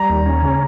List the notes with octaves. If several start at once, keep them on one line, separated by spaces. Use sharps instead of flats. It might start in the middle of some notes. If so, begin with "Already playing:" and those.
Already playing: G3 A#5
D#2
C#4
C#3